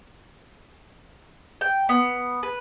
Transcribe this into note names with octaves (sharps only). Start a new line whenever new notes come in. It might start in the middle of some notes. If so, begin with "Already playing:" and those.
G5
B3
B4